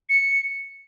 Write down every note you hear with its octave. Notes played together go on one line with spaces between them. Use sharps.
C#7